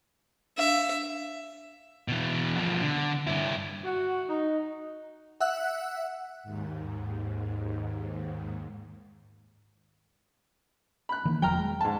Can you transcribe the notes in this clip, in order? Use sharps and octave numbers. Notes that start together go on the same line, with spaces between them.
D4 E5 F5
B2 E3
B2 F3
D3
G2 E4
F#4
D#4
E5 F#5 E6 F#6
D#2 G#2
B5 F#6
D#3 E3 A#3
E1 F3 F#3 G5 A#5 F6
G#3
G#2 A5